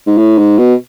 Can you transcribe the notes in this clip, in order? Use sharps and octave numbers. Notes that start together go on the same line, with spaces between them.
G#2
A2
G#2
B2